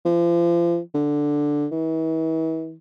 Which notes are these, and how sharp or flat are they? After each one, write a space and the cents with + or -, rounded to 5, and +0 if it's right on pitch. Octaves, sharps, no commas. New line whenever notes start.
F3 -35
D3 +0
E3 -40